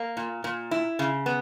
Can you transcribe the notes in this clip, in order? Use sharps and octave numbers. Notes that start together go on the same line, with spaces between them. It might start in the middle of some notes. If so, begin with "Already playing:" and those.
Already playing: A#3
A#2
A#2
E4
C#3
B3